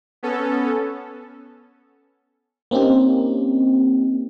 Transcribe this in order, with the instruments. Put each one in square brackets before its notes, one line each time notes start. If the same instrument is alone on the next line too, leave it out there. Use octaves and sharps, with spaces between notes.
[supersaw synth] B3 C#4 A4
[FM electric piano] A#3 C4 C#4 D#4 G4